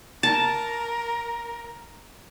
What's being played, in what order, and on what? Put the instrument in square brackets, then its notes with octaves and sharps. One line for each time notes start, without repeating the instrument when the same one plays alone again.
[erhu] A#4 [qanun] A5